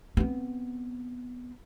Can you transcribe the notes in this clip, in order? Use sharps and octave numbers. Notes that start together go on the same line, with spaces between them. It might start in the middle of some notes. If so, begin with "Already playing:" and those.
B3 C4